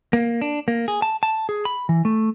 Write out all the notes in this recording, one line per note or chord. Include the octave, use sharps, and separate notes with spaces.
A#3
D4
A#3
G#4
A5
A5
G#4
B5
E3
A3